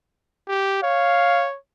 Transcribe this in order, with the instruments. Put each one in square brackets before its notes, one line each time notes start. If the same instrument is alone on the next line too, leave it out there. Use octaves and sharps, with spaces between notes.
[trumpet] G4
[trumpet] C#5 [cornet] F5